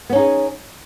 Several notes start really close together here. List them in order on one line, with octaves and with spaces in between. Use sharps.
B3 C#4 D#4 G#4